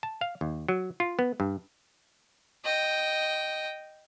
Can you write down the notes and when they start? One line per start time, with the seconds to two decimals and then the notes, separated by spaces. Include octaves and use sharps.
0.03 A5
0.21 F5
0.41 D#2
0.68 F#3
1.00 F4
1.19 B3
1.40 G2
2.64 D#5 G5